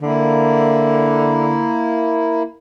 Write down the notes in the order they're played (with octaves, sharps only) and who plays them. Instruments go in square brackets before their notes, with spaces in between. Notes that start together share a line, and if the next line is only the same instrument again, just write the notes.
[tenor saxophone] D3 [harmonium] A#3 E4